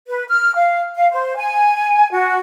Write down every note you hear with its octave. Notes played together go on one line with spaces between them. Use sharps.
B4
F6
F5
F5
C5
G#5
F#4